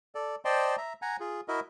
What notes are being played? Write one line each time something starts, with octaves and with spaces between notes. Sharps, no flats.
A4 D5
C5 D5 D#5 G5 A5 C6
E5 A#5
F#5 G#5 A#5
F4 G#4
E4 F#4 A#4 D#5 E5